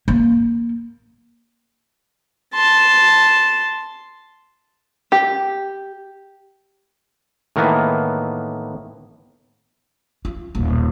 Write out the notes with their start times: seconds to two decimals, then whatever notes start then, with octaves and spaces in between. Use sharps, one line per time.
0.08 A#3
2.54 A5 C6
5.12 G4
7.56 A2 D#3 E3 A#3 B3
10.25 F4
10.55 D#1 B1